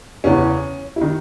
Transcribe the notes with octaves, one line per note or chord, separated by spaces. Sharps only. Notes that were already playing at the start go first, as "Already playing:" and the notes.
E2 C#3 E3 C#4
E4
D#3 D#4